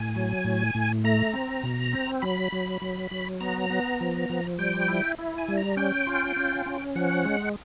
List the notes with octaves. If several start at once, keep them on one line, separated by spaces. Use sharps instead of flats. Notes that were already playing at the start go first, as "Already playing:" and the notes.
Already playing: A2 G#5
F#3
A2
A2
A3 A#5
C4
B2
C4
F#3 B5
F#3
F#3
F#3
B3 A#5
B3
F3
F3
G3 G5
E4
E4
G#5
G3
A#5
C#4 G5
F4
C#4
C#4
F3 F#5
G#3